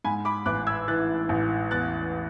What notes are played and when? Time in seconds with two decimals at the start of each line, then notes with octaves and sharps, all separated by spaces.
0.04 G#2 G#5 B5
0.25 B5 D6
0.46 A1 D6 F#6
0.67 E6 G#6
0.88 E3 F#6 A6
1.29 A1
1.71 E2 F#6 A6